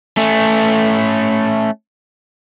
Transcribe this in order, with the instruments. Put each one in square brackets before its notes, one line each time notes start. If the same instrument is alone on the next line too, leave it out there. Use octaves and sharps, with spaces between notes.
[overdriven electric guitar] A3 C#4